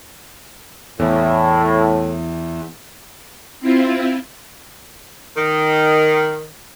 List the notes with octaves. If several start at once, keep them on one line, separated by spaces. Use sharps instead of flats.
E2 A2
C4 E4 F4
D#3